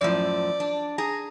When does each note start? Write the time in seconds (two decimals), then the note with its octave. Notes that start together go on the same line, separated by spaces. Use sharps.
0.01 F#2 A2 F3 D5
0.60 D4
0.98 G#4 A#5